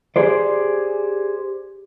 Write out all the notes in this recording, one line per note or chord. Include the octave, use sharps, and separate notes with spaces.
G4 G#4 C5 D5